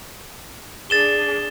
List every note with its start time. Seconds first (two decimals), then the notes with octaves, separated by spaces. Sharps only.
0.90 D4 G#4 A6 E7 G7